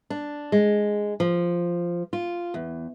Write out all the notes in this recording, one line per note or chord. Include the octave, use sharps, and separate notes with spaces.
D4
G#3
F3
F4
E2